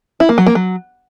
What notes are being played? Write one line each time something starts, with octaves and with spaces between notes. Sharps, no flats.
E4
A#3
F#3
A#3
F#3